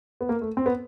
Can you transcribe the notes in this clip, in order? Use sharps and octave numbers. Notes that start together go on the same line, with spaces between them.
B3
A#3
A3
C4
B3